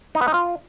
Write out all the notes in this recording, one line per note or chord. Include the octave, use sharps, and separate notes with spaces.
D#4
B3
D#4
F4